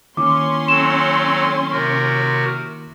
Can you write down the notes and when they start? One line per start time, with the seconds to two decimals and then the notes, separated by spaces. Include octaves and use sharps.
0.17 D#3 A#3 C#4 E4 C6 D6
0.68 F#3 C4 A4 E7
1.71 C3 F#4 A#4